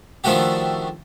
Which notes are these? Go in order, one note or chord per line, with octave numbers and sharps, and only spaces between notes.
D#3 F3 A3 D4 F#4 G4